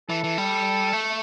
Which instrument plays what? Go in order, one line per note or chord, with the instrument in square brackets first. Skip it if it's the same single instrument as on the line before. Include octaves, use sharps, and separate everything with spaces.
[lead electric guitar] E3 [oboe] A4
[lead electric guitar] E3
G3
A3